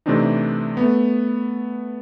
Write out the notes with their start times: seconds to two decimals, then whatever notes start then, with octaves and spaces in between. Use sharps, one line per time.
0.06 C3 E3 A3 C4 D4 D#4
0.77 A3 B3